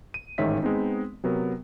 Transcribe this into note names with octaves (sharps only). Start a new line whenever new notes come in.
D#7
A1 G#2 D#3 C#5 E5 B6
G#3 B3 C4 D#4
C3 F#3 B3 A#4